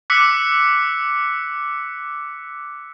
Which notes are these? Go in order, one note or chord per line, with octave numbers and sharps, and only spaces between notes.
D6 E6 F#6 B6 C#7